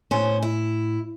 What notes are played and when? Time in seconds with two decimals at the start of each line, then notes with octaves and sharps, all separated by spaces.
0.11 A2 C#4 C5
0.43 E4